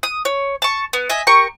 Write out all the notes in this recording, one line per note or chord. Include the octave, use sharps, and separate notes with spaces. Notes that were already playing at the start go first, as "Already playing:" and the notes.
D#6
C#5
A5 C#6
B3
D#5 E5 G#5
G4 A#4 C#6